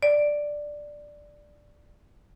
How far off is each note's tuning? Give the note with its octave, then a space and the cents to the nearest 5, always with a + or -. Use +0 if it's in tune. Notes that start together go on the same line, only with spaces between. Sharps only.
D5 +5